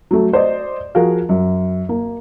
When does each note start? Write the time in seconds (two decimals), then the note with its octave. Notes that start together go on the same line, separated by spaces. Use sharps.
0.11 F#3 A3
0.33 C5 D5 D#5
0.95 F3 F#4 G#4 A#4 F5
1.29 F#2
1.89 A#3